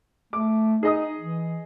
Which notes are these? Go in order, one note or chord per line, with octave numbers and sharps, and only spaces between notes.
A3 D6
D#4 G#4 D#5 D#6
E3